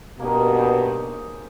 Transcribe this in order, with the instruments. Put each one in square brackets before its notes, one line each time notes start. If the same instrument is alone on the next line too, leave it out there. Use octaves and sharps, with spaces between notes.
[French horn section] G2 B2 [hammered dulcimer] A#3 C#4 D#4
[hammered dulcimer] G#4 C5 C#5